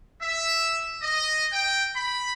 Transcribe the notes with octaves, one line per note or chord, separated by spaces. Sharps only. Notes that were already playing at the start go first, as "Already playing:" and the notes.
E5
D#5
G5
B5